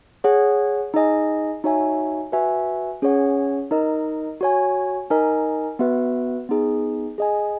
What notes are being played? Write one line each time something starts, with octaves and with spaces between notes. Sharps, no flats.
G#4 C#5 F#5
D#4 G#4 D#5 G#5
D#4 F#4 C#5 E5 G#5
F#4 B4 E5 G#5
C#4 G#4 C#5 F#5
D#4 A#4 D#5
F#4 C#5 G#5
D#4 A#4 D#5 G#5
B3 F#4 B4 E5
B3 D#4 G#4
G#4 D#5 G#5